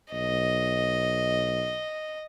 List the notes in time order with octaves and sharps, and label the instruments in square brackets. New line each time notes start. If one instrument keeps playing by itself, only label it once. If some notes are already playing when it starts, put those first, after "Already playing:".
[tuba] B1 [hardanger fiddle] D#5